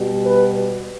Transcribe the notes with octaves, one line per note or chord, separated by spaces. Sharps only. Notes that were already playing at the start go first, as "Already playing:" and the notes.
Already playing: B2 G3
B4